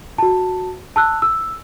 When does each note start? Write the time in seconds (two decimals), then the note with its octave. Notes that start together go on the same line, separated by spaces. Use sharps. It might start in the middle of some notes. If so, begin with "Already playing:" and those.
0.18 F#4 A5
0.96 A5 E6 F#6
1.22 E6